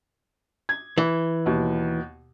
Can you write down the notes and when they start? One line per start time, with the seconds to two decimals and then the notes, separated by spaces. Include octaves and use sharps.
0.69 G#6
0.98 E3
1.46 D#2 B2